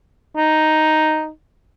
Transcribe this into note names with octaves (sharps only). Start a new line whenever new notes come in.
D#4